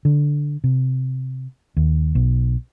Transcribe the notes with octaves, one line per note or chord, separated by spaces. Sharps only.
D3
C3
D#2
B1